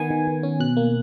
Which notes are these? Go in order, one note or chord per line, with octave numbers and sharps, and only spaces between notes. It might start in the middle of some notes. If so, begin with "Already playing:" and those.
Already playing: D#3 B3 G#5
D#3
D#3
C#4
B2 F#6
A#3